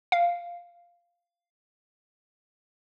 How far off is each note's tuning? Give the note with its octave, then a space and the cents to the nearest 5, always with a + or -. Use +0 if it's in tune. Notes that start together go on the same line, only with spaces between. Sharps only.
F5 -5